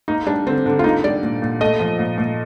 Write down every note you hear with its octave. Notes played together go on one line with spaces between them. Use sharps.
A#3 D#4
G3 D4
D3 C4
D3
F4
A#3 D#4
G3 D5
A#2
A#2
A3 D#5
F3
A#2
A#2